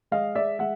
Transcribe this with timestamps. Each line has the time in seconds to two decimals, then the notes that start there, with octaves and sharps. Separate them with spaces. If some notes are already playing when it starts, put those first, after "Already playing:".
0.11 G#3 D#5 F5
0.35 G#3 D5 E5
0.59 G#3 E5 F#5